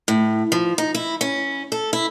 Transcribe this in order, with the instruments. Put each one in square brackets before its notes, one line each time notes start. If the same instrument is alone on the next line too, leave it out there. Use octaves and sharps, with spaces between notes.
[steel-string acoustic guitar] A2
F3
D#4
E4
C#4
A4
E4